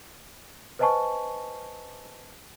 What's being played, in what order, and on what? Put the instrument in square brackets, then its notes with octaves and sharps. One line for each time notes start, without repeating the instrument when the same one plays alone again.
[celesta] B4 C5 D#5 G#5 A5 C#6